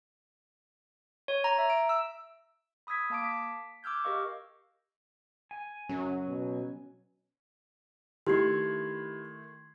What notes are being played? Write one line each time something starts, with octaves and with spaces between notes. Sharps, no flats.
C#5
A#5
E5
D7
E6
B5 D#6 E6 G#6 B6
A#3 F5 A5 D6 D7
B6
D6 E6 F6 G6 G#6
G4 A#4 D#5 F5 C#6
G#5
F#2 F#3 C#4
B2
D#3 A3 E4 G4 C6 G#6 C7